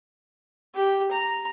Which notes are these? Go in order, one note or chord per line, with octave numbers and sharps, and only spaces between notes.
G4
A#5